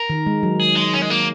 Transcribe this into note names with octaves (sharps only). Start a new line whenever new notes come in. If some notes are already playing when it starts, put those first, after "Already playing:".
Already playing: A#4
D#3
G#3
F#3
G#4
G#3
C#4
G#3
A#3